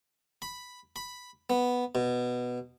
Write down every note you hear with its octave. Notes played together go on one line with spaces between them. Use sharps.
B5
B5
B3
B2